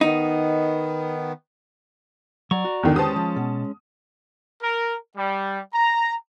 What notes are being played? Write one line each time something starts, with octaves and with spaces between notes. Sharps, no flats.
D#3 B3 D#4
F#3 D5 A#5 C#6
F#4
E2 D3 D#3
G#3 C#4 G4 B4 C5 A5 D#6
F3
B2
A#4
G3
A#5